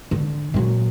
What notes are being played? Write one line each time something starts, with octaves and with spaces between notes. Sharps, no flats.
D3
A#2 F#3